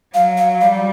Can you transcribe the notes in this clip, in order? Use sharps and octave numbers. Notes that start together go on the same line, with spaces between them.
F#3 F5
F5
G3 F5